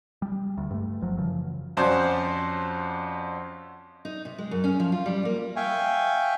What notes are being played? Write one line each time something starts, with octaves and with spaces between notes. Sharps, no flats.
G3
D2
G2 A3
F#1 F3 F#3
F#2 C#3 E3 F3
F2 C#4 F#4 C5 D5
D#4
C3
G#3
F#2
C#4
F3
F4
G3
A#3
E5 F5 G5 G#5 C#6